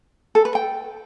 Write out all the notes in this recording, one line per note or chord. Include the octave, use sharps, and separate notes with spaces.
A4
B4
G5